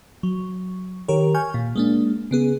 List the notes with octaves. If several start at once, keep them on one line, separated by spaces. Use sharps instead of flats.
F#3
D#3 G4 A#4 C#5
G#5 C#6 F6 G6
A#2
G#3 A#3 D4
C#3 B3 G#4